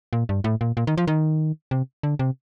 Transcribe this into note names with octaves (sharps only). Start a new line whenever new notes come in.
A#2
G2
A2
A#2
A#2
D#3
F3
D#3
C3
D3
C3